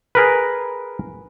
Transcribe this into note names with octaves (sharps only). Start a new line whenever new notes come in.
G#4 A#4 B4